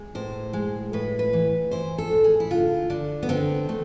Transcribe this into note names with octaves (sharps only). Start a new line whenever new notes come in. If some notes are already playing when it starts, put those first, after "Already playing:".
Already playing: G#3
A2 C5
G#3
A2 B4
B4
E3
E3 C5
A4
A2
G#4
E4
D3 F4
D3 D4
B3
D3 C4
A3